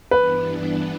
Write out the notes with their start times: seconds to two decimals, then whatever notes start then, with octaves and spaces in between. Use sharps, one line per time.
0.11 G2 E3 B3 D4 B4